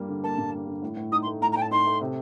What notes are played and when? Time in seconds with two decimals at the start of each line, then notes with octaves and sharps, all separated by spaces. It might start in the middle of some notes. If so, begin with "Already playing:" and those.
Already playing: G2 G3 A#3
0.09 D3
0.23 A#3 A5
0.38 G2
0.53 G3
0.67 D3
0.82 A2
0.97 A2
1.12 D#4 D#6
1.22 C6
1.26 A3
1.42 A2 A#5
1.52 A#5
1.56 A2 G5
1.61 A5
1.71 D#4 C6
1.86 A3
2.01 C3